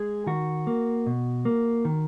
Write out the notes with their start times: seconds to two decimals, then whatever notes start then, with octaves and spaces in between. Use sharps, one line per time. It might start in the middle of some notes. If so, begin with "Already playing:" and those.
Already playing: G#3 G#4
0.27 D#3 F#4
0.67 A#3
1.06 B2
1.45 A#3
1.85 D#3